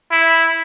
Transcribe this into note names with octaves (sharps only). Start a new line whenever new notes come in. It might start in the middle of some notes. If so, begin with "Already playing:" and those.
E4